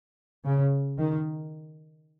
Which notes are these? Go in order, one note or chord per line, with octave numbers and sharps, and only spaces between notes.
C#3
D#3